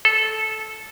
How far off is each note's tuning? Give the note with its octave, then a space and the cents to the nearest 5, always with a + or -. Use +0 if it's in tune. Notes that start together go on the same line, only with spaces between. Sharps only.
A4 -15